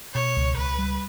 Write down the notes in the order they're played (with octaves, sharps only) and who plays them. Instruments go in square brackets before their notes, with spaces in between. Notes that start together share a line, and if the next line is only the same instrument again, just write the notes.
[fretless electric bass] B2 [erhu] C#5
[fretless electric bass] C#2
[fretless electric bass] C#2 [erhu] B4
[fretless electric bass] G3